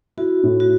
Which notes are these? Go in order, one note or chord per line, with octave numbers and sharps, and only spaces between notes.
E4 F#4
A2
F#4